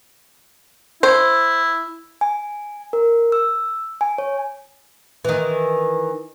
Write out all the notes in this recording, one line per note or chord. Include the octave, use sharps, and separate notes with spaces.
E4 C5
G#5
A#4
E6
G#5
C#5
D#3 E3